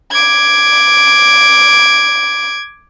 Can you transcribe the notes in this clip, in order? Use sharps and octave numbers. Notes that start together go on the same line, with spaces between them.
D6 G#6